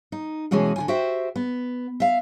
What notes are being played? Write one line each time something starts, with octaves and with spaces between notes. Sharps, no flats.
D#4
B2 E3 G#3 C#4 F#4 G#4
D3 F4 G#5
F#4 G4 C5 E5 G5
B3
E5 F5